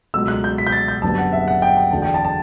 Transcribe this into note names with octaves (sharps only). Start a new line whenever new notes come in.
C#2 B2 F#3 A3 E6
F#6
G6
B6
G6
A6
G6
F#1 F#2 D3 G3 B3 A5
F#5
E5
F#5
G5
G5
E2 D3 F#3 A3 A5
G5
A5
A5